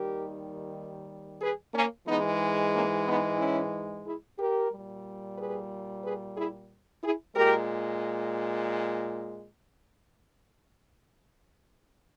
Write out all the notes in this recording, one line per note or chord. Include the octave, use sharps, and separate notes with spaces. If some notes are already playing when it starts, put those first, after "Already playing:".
Already playing: D#2 D#3 G3 G4 A#4
G#4 B4
A#3 C#4
G#2 E3 G#3 B3 D#4
A#3 C#4
B3 D#4
C#4 E4
E4 G#4
G4 A#4
A#2 G3
G#4 B4
G#4 B4
E4 G#4
E4 G#4
A#2 G#3 G4 A#4